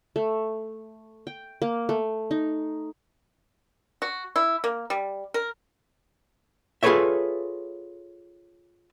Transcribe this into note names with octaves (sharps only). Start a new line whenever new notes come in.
A3
G5
A#3
A3
D#4
F#4
E4
A#3
G3
A#4
F4 G#4 A4 B4 C#5 E5